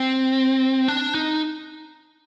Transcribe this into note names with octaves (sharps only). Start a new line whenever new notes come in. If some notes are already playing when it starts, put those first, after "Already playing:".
Already playing: C4
D4
D#4